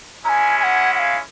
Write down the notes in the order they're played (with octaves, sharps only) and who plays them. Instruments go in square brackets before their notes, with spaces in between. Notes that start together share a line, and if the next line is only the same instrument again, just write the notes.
[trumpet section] G#3 C#4 E4 [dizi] G#5 A#5
[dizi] G#5
F#5
F#5
F5